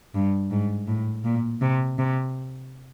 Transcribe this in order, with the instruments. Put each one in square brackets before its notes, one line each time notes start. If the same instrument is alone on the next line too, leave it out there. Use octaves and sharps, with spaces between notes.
[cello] G2
G#2
A2
A#2
C3
C3